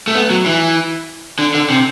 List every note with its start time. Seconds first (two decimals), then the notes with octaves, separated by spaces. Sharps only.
0.08 A3
0.15 B3
0.30 F#3
0.46 E3
1.39 D3
1.54 D3
1.70 C3